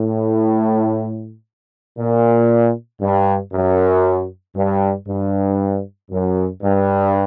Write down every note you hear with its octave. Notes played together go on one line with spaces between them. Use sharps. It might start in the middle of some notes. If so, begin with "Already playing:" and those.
Already playing: A2
A#2
G2
F#2
G2
G2
F#2
G2